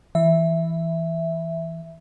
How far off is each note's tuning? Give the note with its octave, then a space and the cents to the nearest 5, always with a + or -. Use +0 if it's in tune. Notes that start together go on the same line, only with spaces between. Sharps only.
E3 +0 E5 +0